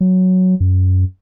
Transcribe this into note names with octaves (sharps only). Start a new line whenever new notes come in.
F#3
F#2